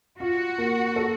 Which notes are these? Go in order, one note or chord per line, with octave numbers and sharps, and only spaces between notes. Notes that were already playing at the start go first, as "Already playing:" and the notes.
F4 F#4
A#3
A4